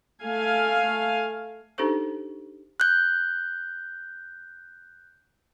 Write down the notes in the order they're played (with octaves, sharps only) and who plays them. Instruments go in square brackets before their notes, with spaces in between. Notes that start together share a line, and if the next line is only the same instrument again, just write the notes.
[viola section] A3 F5 G#5
[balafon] D4 D#4 G4 A4 C5 C#6
[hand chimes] F#6 G6